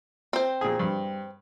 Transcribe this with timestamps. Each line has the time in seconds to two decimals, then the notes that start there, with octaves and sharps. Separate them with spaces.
0.33 C4 C5
0.61 A#2 G#4
0.79 G2